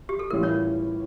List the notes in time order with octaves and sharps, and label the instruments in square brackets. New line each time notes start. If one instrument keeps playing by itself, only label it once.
[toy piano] G4
A4
[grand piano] A2 E3 G3 C#4 F4 [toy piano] A#4
[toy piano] C#5